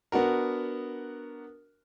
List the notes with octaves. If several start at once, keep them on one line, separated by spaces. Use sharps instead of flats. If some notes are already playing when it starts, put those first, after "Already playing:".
B3 D4 F#4 A#4